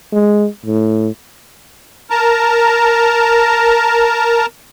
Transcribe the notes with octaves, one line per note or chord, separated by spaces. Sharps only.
G#3
A2
A#4 A5 A#5